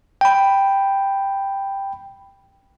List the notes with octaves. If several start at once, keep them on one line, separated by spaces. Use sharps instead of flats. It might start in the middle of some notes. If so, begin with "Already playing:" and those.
G5 B5